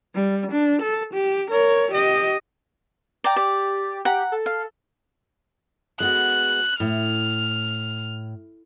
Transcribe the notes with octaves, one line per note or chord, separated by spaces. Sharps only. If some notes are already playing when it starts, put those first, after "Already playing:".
G3
D4
A4
G4
A#4 C#5
G4 D#5
D5 G5 A#5
G4 D5
G4 F#5 A#5
A4
F5
G#3 B3 F#4 F#6
A2 F6